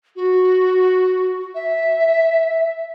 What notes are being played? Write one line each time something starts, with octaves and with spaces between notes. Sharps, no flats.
F#4
E5